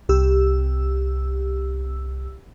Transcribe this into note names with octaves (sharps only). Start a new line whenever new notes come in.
C2 G4 E6